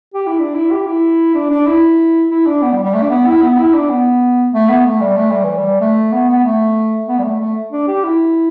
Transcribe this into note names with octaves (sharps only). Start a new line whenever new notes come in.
G4
E4
D4
E4
G4
E4
D4
D4
E4
E4
D4
B3
G3
G3
A3
D4
B3
E4
B3
E4
D4
B3
A3
B3
A3
G3
A3
G3
E3
G3
A3
B3
B3
A3
B3
G3
A3
A3
D4
G4
E4